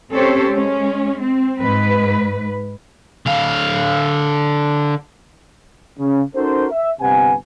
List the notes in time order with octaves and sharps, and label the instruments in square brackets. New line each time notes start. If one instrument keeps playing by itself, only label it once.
[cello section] C4 C#4 G4 A4 C5 C#5
G#3 C#4
C4
G#2 B4
[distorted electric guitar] D3 F5
[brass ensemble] C#3
C#4 D#4 F#4 A4 A#4 C5
E5
G1 C3 B4 F#5 G#5